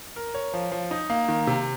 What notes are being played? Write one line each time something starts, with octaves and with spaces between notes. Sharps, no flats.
A#4
C#5
F3
F3
D#4
A#3
D#3
C3